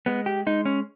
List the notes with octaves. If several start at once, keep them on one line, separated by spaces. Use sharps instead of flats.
G#3 B3
G4
G#3 D#4
C#4